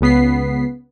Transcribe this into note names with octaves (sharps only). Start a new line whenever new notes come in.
C#2 C#3 B3 B6 C7